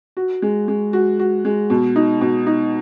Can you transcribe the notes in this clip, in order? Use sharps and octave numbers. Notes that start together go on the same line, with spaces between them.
F#4
G#3
G#3
F#4
F#4
G#3
B2
D#4
B2
D#4